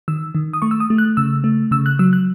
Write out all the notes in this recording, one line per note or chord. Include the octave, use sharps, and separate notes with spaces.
D#3 E6
D#3
D#6
A3 C#6
E6
D#6
A3
F#6
C#3 E6
A3
C#3 E6
F#6
F#3 E6
F#6